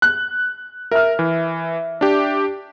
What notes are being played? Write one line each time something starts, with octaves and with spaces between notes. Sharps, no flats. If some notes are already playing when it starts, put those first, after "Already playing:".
F#6
A#4 E5 F6
E3
D4 G4